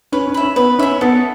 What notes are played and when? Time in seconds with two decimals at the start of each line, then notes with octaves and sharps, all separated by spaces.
0.12 C#4 B4
0.27 C#4
0.34 E5 B5
0.42 C#4
0.56 B3 B4
0.79 C#4 E5 B5
1.01 B3 A4